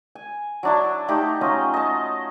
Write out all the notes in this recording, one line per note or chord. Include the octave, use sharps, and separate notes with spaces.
G#5
F#3 D4 E4
A3 D#4 G4
F#3 C#4 F4 D#5
D#5 A5